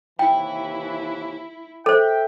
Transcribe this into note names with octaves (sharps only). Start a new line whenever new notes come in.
D#2 C3 E3 E4 G5
A4 C5 E5 G5